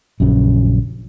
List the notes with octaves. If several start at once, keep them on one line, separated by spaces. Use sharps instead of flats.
A#1 F#2 C#3